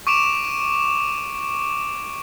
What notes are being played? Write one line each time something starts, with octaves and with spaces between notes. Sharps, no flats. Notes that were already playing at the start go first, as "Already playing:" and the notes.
C#6 D6 D7 E7 F7